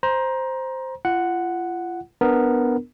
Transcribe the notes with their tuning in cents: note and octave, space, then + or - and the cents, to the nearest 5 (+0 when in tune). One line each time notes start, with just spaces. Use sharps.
C5 +0 A#5 +25
F4 -35 F#5 +0
B3 +0 D4 +0 A#4 +0